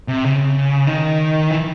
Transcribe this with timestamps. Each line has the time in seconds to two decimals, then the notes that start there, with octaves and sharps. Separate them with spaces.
0.08 C3
0.24 C#3
0.87 D#3
1.51 E3